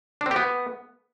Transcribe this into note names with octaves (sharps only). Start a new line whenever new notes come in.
D4
C4
G4
B3